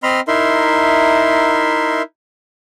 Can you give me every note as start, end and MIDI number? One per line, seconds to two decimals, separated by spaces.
0.03 0.20 60
0.03 0.20 75
0.03 0.20 83
0.03 0.20 84
0.03 0.20 89
0.28 2.02 63
0.28 2.02 64
0.28 2.02 70
0.28 2.02 76
0.28 2.02 84